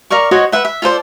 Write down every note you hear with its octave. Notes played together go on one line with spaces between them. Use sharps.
A#4 D5 F5 C#6
F#4 C5 C#5 D#5
B4 E5 F#5
E5
F4 A4 C5 D5